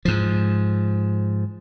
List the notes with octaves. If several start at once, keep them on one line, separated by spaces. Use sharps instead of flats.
G#2 F3